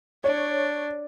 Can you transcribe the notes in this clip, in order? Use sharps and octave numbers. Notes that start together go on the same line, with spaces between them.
D4 C#5